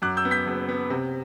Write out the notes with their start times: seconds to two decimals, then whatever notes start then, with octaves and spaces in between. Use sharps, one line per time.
0.02 F#2 D6 F#6
0.17 E6 G6
0.25 B3
0.31 G6 B6
0.46 F#1
0.69 B3
0.90 C3